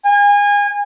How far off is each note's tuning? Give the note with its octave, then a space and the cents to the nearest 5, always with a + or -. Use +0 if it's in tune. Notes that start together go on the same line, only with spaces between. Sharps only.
G#5 -30